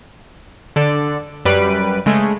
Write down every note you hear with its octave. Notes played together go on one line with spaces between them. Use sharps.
D3 A4 D5
F#2 G3 B4 D7
C#3 G#3 A3